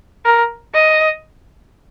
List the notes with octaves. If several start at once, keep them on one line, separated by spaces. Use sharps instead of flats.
A#4
D#5